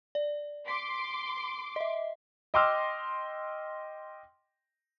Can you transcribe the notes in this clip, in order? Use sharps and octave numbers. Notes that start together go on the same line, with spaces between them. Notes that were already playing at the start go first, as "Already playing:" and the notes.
D5
C6 D6 B6
D#5 E5
D#5 G5 C6 D6 E6 F6